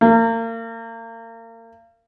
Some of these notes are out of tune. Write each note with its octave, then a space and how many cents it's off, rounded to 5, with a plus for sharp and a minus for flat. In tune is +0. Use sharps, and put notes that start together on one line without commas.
A#3 -35